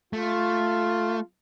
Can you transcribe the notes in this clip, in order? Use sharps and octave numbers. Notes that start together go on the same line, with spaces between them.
A3 F4